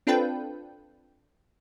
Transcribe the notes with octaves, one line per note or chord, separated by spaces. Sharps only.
C4 D4 F4 A4 B4 G5